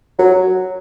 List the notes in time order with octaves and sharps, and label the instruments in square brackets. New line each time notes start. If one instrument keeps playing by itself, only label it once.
[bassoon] F#3